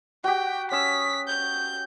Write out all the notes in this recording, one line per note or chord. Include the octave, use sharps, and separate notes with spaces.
F#4 G4 G5
C#4 D#6 E6 B6
G6